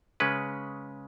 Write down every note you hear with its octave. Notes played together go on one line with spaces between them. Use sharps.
C#3 G#3 C#4 B4